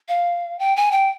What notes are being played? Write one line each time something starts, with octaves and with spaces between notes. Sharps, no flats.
F5
G5
G#5
G5